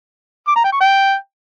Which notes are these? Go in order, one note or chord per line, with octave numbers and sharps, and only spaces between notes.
D6
A#5
G5
C#6
G5